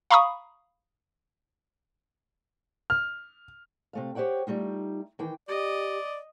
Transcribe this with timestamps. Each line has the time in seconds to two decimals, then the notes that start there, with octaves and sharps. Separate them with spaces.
0.11 F5 A#5 B5 C#6 D#6
2.90 F6
3.93 C3 A3 F5
4.15 G4 C5 C#5 F#5 G5
4.47 G3 A3 D#4 F4
5.19 D#3 E3 G5
5.49 G4 D5 D#5